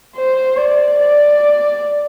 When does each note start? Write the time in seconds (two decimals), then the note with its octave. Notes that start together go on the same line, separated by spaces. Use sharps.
0.17 C5
0.57 D5
0.98 D5